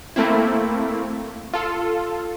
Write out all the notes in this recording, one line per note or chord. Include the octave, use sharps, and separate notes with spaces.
A3 A#3 C4 E4
F4 A4